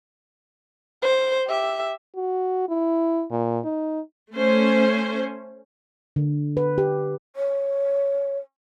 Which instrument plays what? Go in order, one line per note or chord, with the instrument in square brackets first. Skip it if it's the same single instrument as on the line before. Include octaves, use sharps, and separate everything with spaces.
[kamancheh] C5
G4 E5
[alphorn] F#4
E4
A#2
D#4
[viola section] A3 C#4 C5
[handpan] D3
B4
G4
[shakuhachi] C#5